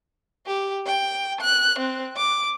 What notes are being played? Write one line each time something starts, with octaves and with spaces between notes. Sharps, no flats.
G4
G5
F#6
C4
D6